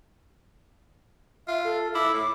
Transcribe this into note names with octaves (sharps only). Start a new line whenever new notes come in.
F4 E5
A4
E4 D6
A2